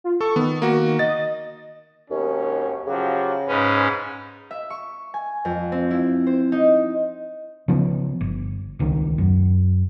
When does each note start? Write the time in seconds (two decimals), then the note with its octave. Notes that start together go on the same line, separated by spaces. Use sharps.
0.04 F4
0.21 A4 C#6
0.36 D#3 B3
0.62 A#3 F#4
0.99 D#5 A6
2.10 G#1 D#2 B2 C#4
2.86 C#3 F3 F#3 G4
3.48 G#2 G#3 C#4 B4
4.51 E5
4.70 C#6
5.14 G#5
5.45 F2
5.72 C4
5.91 E4
6.27 C5
6.52 D#4
7.68 C#3 F3 B3
8.21 G1
8.79 D#1 C#2 D#3
9.18 F#2